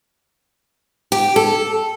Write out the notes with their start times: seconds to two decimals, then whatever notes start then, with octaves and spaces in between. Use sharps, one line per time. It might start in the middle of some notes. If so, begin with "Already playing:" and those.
1.12 G4
1.36 A4